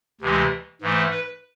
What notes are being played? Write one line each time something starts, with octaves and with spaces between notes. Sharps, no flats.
D2 C3 E3 G#3
G#2 E3 A3
B4